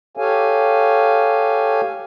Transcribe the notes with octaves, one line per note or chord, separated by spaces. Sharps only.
G4 A4 C#5 F5 G#5